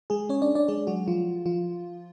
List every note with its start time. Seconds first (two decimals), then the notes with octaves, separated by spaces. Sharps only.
0.10 G#3 G#4
0.29 C#4 C#5
0.42 D4 D5
0.55 D4 D5
0.68 G#3 G#4
0.87 F#3 F#4
1.08 F3 F4
1.46 F3 F4